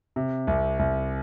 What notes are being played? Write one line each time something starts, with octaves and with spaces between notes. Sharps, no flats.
C3
C2
C2